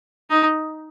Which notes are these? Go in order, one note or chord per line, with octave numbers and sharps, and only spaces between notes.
D#4